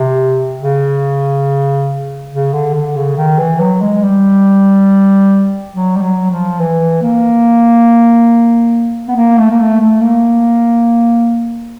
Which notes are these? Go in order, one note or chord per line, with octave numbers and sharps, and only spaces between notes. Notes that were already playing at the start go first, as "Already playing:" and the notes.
Already playing: C3
C#3
C#3
D3
D3
C#3
D#3
E3
F#3
G#3
G3
F#3
G3
F#3
F3
E3
A#3
B3
A#3
A3
A#3
A3
A3
A#3